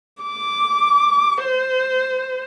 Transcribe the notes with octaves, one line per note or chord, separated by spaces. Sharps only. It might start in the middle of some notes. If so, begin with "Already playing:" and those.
D6
C5